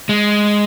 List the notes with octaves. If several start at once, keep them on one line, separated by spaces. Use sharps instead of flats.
G#3